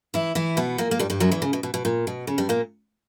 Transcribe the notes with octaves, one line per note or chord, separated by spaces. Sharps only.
E3 E4
E3 E4
B2 B3
A#2 A#3
A#3
G2 G3
G2 G3
F#2 F#3
E2 E3
C#3
B2
B2
B2
A#2
B2
C#3
G2 G3
A#2 A#3